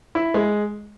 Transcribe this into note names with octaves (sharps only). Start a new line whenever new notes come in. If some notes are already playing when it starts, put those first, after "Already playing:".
E4
G#3